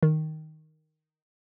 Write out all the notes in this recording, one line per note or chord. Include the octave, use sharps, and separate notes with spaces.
D#3